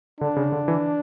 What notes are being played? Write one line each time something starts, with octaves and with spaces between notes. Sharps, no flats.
D3 D4
C#3
D3
E3